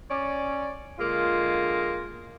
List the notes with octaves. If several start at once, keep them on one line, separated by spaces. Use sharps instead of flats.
C#4 C#5 D5
D3 G#3 A#3 F4